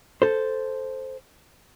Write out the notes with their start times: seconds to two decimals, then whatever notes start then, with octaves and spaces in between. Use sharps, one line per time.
0.22 A4 C5